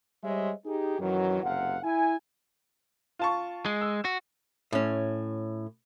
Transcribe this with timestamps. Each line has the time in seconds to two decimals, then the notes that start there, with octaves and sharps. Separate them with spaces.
0.24 G3 G#3 C5 C#5 D#5 E5
0.65 D#4 G4 G#4
0.99 F#2 D#3 E3 F#3
1.43 F#1 C3 F5 F#5
1.84 E4 G#5
3.19 F4 A5 C#6
3.66 G#3
3.81 E6
4.05 F#4
4.72 A2 C#4